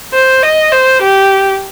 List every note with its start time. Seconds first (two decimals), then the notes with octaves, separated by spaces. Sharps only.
0.14 C5
0.43 D#5
0.72 C5
1.02 G4